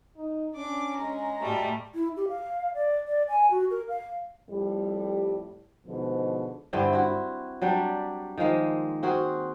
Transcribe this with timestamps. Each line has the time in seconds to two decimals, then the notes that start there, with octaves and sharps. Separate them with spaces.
0.16 D#4
0.54 C#4 D4 D6
0.96 G#3 A#5
1.41 A2 G3 A3 F#4
1.95 E4
2.17 G4
2.29 F5
2.75 D5
3.07 D5
3.29 G#5
3.51 F#4
3.71 A#4
3.89 F5
4.50 F2 A2 G3
5.86 G#2 B2 D3 F3
6.73 G2 D3 C4 E4
6.93 E4 F#4
7.62 F#3 G3 D4 G4
8.38 D#3 F3 G#3 A#3
9.03 C4 F#4 G#4 A#4